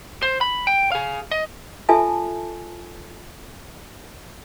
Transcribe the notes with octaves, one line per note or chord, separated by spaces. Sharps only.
C5
B5
G5
G#4 F5
D#5
F4 A4 E5 G#5 A5